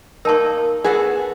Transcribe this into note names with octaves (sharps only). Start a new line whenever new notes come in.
A#3 D#4 A#4 A5 C#6
B3 F#4 G#4 A4